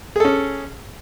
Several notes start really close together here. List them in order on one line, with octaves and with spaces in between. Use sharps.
G#4 A4 C#4